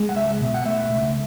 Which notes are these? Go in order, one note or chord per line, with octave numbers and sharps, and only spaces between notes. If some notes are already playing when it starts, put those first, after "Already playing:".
Already playing: G#3
F#5
C#2 E5
B2
F#5
A3 E5
C#2